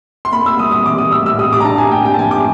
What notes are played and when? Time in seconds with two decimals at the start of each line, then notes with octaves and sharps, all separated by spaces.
0.25 C6
0.33 A#3 B5
0.46 E6
0.59 G3 D#6
0.72 D#6
0.85 E3 D6
0.98 D#6
1.12 A2 E6
1.26 E6
1.39 G4 D#6
1.53 D6
1.60 A#5
1.65 D4 A5
1.78 G#5
1.91 A#3 G5
2.06 G5
2.14 A5
2.18 F3 G#5
2.31 D6